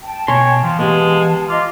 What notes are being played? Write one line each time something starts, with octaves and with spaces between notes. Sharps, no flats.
G5 A5
B2 C#5 G#5 C6
E3 F3
G#3 B3 G4 F5 A5
F4 D#5 D6